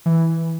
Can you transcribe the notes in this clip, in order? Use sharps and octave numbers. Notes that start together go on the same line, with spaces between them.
E3